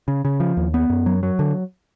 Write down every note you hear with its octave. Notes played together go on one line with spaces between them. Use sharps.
C#3
C#3
F3
D#2
B3
F#2
F#3
F#3
D3